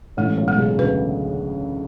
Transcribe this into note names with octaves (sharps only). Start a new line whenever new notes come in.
A1 A2 G#3
B1 B2
G#3
C#2 C#3
D2 D3 B4